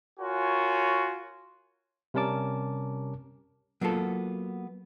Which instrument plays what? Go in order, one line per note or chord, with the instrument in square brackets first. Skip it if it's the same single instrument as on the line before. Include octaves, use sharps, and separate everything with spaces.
[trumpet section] F4 F#4 A#4 C#5 G#5
[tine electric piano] C3 G3 C#4 A#4 A5 D6
[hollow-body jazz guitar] F#3 A#3 B3 F4 A4